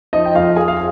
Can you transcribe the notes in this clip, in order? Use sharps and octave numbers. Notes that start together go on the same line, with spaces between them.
F3 D#4 D#5
G5
F2 F4 F5
F3 G#4 G#5
F5